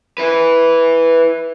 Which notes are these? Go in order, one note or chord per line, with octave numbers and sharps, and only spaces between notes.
E4 B4